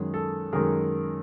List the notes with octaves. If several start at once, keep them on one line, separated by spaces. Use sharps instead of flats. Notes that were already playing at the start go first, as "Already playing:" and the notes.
Already playing: F#2 D#3 G#3 G#4
A4
F#2 D#3 G#3 G#4 A#4